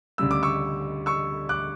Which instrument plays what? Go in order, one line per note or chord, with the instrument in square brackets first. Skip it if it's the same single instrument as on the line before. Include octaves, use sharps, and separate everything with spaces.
[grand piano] D2 C#3 G3 E6
D6
C#6 E6
C#6 E6
D6 F#6